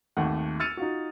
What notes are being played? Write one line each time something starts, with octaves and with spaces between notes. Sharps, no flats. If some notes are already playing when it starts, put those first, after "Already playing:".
G#1 D#2 A3 F#5
E6 F6 A6 C#7 D#7 F7
D#4 F4 F#4